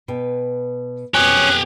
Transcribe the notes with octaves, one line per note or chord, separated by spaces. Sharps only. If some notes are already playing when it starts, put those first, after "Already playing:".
B2 B4 G5
F2 B2 F#3 C#4 G4 G#4 F#6